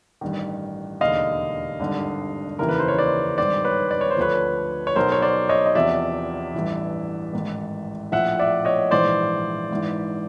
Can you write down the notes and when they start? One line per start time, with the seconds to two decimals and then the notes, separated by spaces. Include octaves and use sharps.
0.21 A1 G2 D#3
1.01 E1 D#2 D3 D#5 F5
1.80 G#1 G2 D3
2.59 F1 D#2 C#3 E3 A#4
2.69 B4
2.79 C5
2.88 C#5
2.99 C5 D5
3.38 G#1 G2 D#3 C5 D5
3.65 B4 C#5
3.91 D5
4.01 C#5
4.11 C5
4.17 D2 D3 F3 B4 C#5
4.87 C#5
4.96 B1 B2 A#4 C5
5.12 C#5
5.22 C5 D5
5.49 C#5 D#5
5.66 D#5
5.75 E2 C3 F3 D5 E5
6.54 A1 G2 E3
7.33 A1 G#2 D#3
8.12 A#1 A2 F3 E5 F#5
8.39 D5 E5
8.65 C#5 D#5
8.91 A#1 G#2 E3 C5 D5
9.70 G#1 G#2 E3